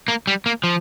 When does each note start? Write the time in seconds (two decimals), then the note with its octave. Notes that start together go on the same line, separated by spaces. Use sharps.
0.08 A#3
0.27 G3
0.46 A#3
0.64 F3